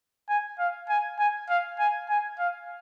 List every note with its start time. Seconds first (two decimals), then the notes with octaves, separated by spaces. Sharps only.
0.29 G#5
0.59 F5
0.89 G#5
1.19 G#5
1.49 F5
1.79 G#5
2.09 G#5
2.39 F5